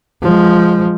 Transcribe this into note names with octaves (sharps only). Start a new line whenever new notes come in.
F3 G#3